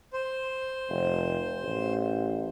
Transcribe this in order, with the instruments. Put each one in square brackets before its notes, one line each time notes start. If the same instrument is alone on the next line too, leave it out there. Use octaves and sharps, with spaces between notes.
[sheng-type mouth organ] C5
[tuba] F1
A1